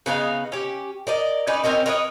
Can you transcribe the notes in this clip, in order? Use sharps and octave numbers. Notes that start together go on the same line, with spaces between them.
C#3 B3 D#4 F5
C#4 G4
A#4 D5 D#5
C#4 D#4 B4 D5
C4 C#4 A#4 D#5
A#4 B4 C#5 D#5